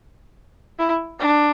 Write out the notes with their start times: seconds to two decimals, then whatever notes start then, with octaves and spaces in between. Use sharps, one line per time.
0.79 E4
1.20 D4